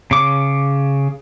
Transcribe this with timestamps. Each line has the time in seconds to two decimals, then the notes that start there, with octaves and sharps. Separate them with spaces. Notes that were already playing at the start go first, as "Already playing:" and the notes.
0.11 C#3 D6